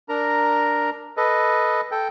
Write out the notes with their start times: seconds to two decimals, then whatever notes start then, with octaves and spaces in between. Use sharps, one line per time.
0.09 D4 A#4 A#5
1.17 A4 B4 D#5
1.91 A4 G5